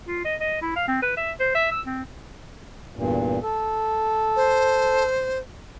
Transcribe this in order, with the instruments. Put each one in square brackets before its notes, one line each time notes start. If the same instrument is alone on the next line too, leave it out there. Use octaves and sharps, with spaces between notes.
[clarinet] F4
D#5
D#5
E4
F5
C4
B4
E5
C5
E5
E6
C4
[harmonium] E2 G2 A#2
A4
[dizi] C5